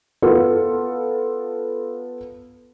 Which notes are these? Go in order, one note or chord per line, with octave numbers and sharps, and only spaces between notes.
B3 F4 A4 B4